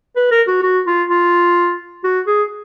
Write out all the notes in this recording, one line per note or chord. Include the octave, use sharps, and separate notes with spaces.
B4
A#4
F#4
F#4
F4
F4
F#4
G#4